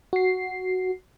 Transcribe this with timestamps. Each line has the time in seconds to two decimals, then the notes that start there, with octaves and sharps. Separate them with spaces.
0.13 F#4 C7